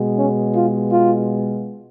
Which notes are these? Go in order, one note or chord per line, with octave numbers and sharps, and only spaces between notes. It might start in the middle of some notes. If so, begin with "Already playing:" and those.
Already playing: B2 G#3 B3
C#4
F4
F4